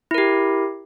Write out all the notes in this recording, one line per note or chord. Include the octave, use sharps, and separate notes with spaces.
E4 G4 A#4